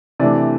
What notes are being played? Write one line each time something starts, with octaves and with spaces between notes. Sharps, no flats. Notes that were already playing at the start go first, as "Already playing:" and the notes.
C3 E3 A3 D4 D5